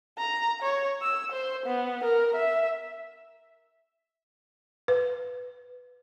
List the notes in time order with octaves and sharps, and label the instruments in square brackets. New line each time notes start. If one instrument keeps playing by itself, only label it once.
[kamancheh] A#5
C#5
E6
C5
B3
A#4
E5
[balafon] B4